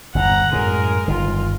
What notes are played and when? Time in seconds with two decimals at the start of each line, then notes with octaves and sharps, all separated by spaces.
0.15 G1 E2 G#2 F#5 A#5
0.53 F#2 A2 G#3 A#4
1.08 G1 D#3 F4